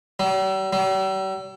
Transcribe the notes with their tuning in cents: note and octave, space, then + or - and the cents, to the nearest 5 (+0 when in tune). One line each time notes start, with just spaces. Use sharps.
G3 -45
G3 -45